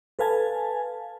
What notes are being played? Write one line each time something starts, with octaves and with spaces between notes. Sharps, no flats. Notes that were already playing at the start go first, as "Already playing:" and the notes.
A4 B4 F5 G#5 A5